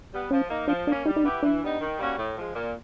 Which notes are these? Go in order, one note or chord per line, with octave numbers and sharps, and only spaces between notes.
G3 B3
F3 C#4
A#3 D#4
F3 D4
A#3 C#4 D4
G3 D#4
D#4
B3 D4 E4 G4
E3 D4
G3 B3 D#4
D#3
G3 A#3 C#4 F#4
A2
F3 G#3
A#2